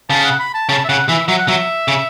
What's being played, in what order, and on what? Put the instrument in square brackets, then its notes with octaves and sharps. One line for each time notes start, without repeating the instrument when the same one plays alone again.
[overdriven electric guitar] C#3 [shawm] A5
[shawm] F#5
B5
A5
[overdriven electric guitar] C#3 [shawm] A5
[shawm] E5
[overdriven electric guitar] C#3 [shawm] F#5
[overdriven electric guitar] E3 [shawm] E5
[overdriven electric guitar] F#3 [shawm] E5
[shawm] F#5
[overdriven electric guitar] F#3 [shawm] E5
[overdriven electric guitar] C#3